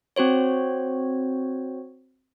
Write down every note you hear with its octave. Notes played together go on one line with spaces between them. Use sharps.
C4 F#4 C5 C#5